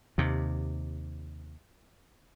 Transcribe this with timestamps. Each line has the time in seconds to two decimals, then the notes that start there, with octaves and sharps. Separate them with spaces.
0.18 D#2 C3